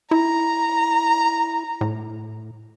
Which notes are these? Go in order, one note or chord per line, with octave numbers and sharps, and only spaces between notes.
E4 A#5
A2